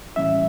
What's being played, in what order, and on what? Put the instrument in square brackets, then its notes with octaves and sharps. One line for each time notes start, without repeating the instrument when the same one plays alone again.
[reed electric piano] A2 E3 G3 C#4 E5